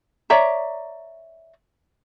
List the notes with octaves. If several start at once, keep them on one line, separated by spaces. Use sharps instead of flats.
C#5 D5 E5 A#5